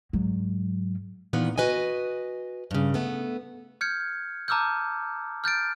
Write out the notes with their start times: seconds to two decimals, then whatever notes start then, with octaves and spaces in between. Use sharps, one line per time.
0.13 G#2 F#3
1.33 A#2 D#3 E3 B3
1.58 F#4 B4 D#5 G#5
2.71 G2 C#3
2.94 A3 B3
3.81 F6 G6 G#6 C#7
4.48 A5 A#5 D6 E6 F6 G6
5.44 F6 G6 A6 D7